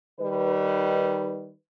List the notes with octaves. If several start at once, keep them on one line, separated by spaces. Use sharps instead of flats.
D#3 G3 D#4 B4